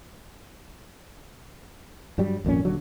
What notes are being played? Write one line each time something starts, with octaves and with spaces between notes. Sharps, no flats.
G2 F#3 G3
G#1 F2 A#2 C#4
D#1 D3 F#3